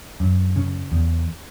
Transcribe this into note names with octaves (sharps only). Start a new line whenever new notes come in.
F#2
C#3
E2